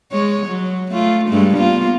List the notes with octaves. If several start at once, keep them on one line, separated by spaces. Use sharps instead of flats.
G#3 C#5
F#3
A3 F4
G2 G#3 A3
A#3 B3 F4